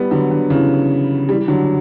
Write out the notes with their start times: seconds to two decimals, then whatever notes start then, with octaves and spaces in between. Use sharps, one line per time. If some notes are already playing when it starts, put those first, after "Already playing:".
Already playing: G3 B3
0.11 D3 F#3
0.31 D3
0.50 C#3 E3
1.29 E3 G3
1.48 D3 F#3